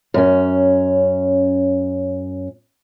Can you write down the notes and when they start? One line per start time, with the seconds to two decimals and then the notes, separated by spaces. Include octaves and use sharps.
0.14 F#2 C#4